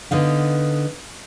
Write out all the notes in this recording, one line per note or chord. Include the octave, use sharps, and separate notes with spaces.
D3 B3 D#4 F5